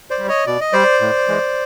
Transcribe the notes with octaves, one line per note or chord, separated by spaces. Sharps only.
C5 D5
G3
C#5 D#5
B2 D5
D#5
G3 C5 D5
A2
E3 G#3